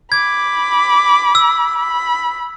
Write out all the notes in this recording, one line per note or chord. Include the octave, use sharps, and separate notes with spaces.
B5 D6 G#6
E6
B5